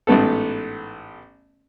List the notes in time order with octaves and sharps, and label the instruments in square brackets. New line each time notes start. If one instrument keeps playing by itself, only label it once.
[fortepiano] A1 G#2 A3 B3 A4